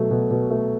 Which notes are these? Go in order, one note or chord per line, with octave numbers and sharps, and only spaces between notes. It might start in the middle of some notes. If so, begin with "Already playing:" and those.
Already playing: B2 F#3 A3
B2
B2
A3